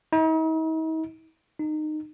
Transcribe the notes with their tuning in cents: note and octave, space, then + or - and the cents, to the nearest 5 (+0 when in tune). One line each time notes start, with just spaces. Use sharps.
D#4 +45
D#4 -20